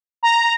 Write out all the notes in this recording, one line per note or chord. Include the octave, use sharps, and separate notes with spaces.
A#5